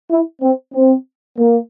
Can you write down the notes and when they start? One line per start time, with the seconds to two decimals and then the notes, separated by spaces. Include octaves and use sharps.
0.10 E4
0.42 C4
0.74 C4
1.38 A#3